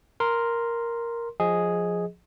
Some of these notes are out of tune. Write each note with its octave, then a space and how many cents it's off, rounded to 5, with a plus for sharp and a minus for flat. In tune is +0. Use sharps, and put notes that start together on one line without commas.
A#4 +0 C6 +0
F3 +15 G#4 +0 D#5 +5